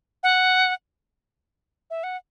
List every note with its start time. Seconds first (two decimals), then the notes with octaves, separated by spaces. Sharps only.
0.23 F#5
1.90 E5
2.03 F#5